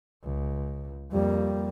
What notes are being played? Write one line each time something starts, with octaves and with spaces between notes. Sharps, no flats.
C#2
F2 G3 A#3